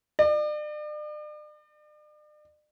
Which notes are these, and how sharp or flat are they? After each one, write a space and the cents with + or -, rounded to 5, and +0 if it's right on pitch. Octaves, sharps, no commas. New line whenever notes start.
D5 +40